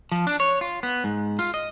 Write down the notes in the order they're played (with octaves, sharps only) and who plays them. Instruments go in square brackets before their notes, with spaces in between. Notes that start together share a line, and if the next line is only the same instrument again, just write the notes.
[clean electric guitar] F3
D4
C#5
F4
B3
G#2
F4
D#5